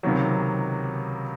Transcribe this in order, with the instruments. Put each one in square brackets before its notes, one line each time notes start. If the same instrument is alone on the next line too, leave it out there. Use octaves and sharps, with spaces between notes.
[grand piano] C#2 C3 D#3 F#3